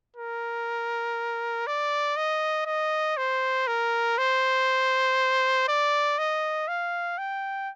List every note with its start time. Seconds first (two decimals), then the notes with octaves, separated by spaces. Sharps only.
0.17 A#4
1.67 D5
2.17 D#5
2.66 D#5
3.17 C5
3.67 A#4
4.18 C5
5.68 D5
6.19 D#5
6.68 F5
7.18 G5